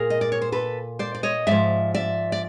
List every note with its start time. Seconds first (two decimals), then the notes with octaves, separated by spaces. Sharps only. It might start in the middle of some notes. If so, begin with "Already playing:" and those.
Already playing: A#2 G#4 A#4
0.10 D#5
0.21 D5
0.32 C#5
0.42 C5
0.52 A4 B4
0.99 C5 D5
1.15 D5
1.23 C#5 D#5
1.47 G#2 F3 D5 E5
1.94 D5 E5
2.32 D5